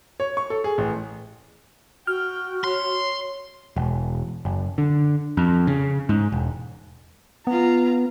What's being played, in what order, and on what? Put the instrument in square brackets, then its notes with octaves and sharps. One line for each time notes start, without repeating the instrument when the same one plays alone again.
[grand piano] C#5
C#6
A4
G#4
A1
[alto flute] F#4 [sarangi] G5 [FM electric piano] F6
[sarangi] C#5 [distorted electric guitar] C6
[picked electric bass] E1
F#1
D3
F2
C#3
G#2
E1
[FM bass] B3 [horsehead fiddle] F4 A#5